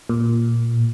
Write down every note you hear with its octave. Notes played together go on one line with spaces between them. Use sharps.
A#2